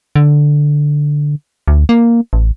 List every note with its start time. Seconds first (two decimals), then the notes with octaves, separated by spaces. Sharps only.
0.16 D3
1.68 D2
1.89 A#3
2.33 A1